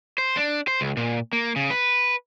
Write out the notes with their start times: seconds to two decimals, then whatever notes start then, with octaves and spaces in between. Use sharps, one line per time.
0.18 C5
0.37 D4
0.67 C5
0.81 C#2
0.97 A#2
1.33 A#3
1.56 C#3
1.70 B4